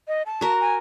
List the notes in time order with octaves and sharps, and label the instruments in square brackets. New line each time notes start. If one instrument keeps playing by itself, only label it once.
[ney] D#5
A5
[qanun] F#4 A#4
[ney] G#5